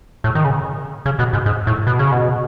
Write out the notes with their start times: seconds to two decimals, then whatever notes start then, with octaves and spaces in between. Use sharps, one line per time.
0.24 A2
0.35 D#3
0.44 C#3
1.06 C#3
1.19 B2
1.33 G#2
1.46 G#2
1.67 A2
1.87 B2
1.99 C#3
2.12 B2